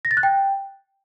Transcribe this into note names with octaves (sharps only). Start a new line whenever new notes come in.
A#6
A6
F#6
G5